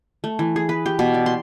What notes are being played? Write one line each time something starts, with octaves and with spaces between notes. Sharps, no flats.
A3
E3
G#4
B4
G4
B2
D5
C6